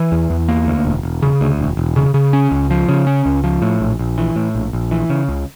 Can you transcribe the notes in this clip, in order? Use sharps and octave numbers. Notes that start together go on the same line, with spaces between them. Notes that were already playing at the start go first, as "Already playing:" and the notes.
Already playing: E3
E2
E2
A#3
D2
E1
E1
C#3
D2
E1
E1
C#3
C#3
C#4
C#2
F3
C#3
C#4
C#2
F3
A2
A#1
A#1
E3
A2
A#1
A#1
E3
C#3
C#2